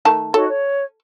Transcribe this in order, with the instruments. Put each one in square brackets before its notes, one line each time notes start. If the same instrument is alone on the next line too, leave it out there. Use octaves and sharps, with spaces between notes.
[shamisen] D#3 A3 A5
[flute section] D#4 F#4 C#5 [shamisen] A4
[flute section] C#5